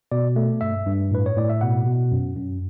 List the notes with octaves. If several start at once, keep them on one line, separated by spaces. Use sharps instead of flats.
B2 D5
A3
G2 E5
G2
A2 B4
C#5
A2 D5
E5
B2 F#5
B2
F#2
F#2